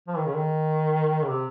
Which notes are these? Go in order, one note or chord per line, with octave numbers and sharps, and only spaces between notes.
F3
D#3
C#3
D#3
C#3
C3